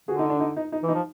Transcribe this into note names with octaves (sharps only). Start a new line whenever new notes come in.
D3 F#4 G#4
D#4
D4
D#4
D#4
D#4
E3
D#4
F3